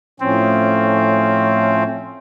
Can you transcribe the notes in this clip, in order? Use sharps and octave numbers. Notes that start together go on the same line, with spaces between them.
A2 F3 C4 C#4